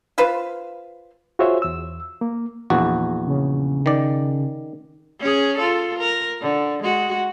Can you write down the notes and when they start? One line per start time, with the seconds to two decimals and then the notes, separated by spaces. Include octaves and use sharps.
0.18 F4 B4 C5 F5
1.39 F4 F#4 G#4 C5 C#5 E5
1.62 E2 E6
2.21 A#3
2.70 A#1 E2 F#4
3.26 C#3
3.86 D#3 D5
5.20 C#4 G#4
5.58 F4 A4
5.98 A#4
6.41 D3
6.83 G#3 F#4